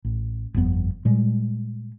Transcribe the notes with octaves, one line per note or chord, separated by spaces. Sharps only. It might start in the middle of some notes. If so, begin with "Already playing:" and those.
A1
G1 F2 B3
A#2 G3 G#3